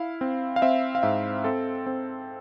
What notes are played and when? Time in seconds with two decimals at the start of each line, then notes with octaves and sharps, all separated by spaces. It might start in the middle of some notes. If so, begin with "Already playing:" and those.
Already playing: E4 F5
0.21 C4
0.56 F5
0.62 C4 E5
0.95 F5
1.03 G#2 E5
1.44 C4 A4
1.86 C4